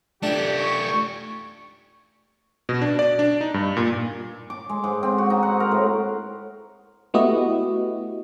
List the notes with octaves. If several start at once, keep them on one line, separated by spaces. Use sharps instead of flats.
A3 D4 F4 G4
C#6
B2
D4
D5
D4
D#4
G2
A#2
D6
G#3
G#2
C4
F#4
D#4
F#5
A#4
A2
A3 B3 E4 F#4 G4 D#5